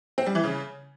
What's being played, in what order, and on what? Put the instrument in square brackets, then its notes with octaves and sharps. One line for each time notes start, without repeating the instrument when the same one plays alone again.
[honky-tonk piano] C4
G3
E3
C#3